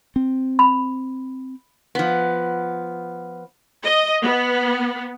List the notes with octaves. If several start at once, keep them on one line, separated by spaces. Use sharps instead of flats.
C4
B5
F3 B3
D#5
B3